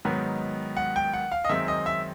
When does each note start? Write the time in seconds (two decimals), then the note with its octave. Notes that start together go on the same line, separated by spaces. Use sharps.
0.05 G#2 D#3 F#3 B3
0.77 F#5
0.96 G5
1.13 F#5
1.32 F5
1.44 D#5
1.49 F#2 D#3 G#3 C4 E5
1.68 D#5
1.86 E5